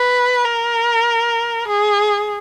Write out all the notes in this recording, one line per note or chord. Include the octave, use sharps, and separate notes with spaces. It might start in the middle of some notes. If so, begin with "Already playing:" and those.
Already playing: B4
A#4
G#4